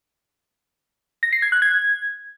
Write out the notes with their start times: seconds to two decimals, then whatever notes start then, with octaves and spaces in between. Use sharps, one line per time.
1.23 A#6
1.33 C7
1.42 G#6
1.52 F#6
1.62 G#6